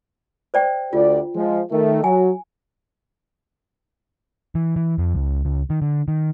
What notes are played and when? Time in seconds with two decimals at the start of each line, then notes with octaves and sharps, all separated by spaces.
0.54 C5 D5 G5
0.93 D2 F4 G4 D5
1.35 F3 G#3
1.71 D#3 A3
2.04 F#3 G#5
4.55 E3
4.76 E3
4.98 F2
5.15 C#2
5.45 C#2
5.70 D#3
5.82 D3
6.08 D#3